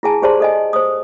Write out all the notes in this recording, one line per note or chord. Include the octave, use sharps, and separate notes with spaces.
E4 G#4 G#5 A5
G4 G#4 C5 D5 A5 C6
A4 D#5 G#5
C5 D#6